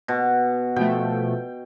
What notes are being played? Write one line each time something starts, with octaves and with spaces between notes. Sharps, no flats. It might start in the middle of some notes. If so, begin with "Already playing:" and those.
B2
B2 F3 A3 G5